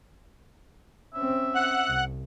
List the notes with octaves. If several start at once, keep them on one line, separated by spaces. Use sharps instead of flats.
C4 C#4 E5
F#5 F#6
C2